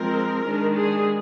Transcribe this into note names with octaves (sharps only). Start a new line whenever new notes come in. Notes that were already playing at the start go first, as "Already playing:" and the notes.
Already playing: F3 G#3 C4 A#4
D#3 G#3 D4
G#4